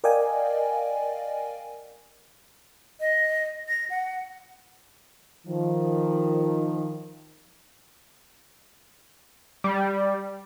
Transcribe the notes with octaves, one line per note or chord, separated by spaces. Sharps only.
A#4 D5 D#5 F5 G5 G#5
D#5
A#6
F#5
D#3 F3
G3